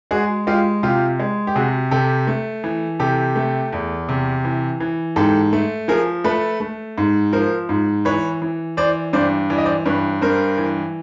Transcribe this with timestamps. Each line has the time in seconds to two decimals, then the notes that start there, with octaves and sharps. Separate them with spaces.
0.11 G#3 F#4 G#4
0.47 G#3 F4 G4
0.83 C3 F4 G4
1.20 G#3
1.47 G4
1.55 C3 F#4 G#4
1.91 C3 G4 A4
2.27 A3
2.64 E3
3.00 C3 G4 A4
3.36 A3
3.73 E2
4.09 C3
4.45 E3
4.80 E3
5.16 G#2 G4 A4
5.53 A3
5.88 F3 G#4 A#4
6.24 A3 A4 B4
6.60 A3
6.98 G#2
7.32 F3 A#4 C5
7.69 G#2
8.05 E3 B4 C#5
8.42 E3
8.77 E3 C5 D5
9.13 G2 C5 D5
9.50 E3 D5
9.58 D#5
9.65 C5 D5
9.86 G2 B4 C#5
10.21 G2 A#4 C5
10.58 E3